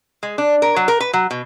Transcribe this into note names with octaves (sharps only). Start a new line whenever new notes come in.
G#3
D4
A#4
F#3
A#4
B4
F#3
B2